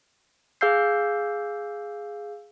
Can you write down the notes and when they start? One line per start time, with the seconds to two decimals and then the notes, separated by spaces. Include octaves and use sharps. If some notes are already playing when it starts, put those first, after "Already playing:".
0.61 G#4 F5 E6 G6 C7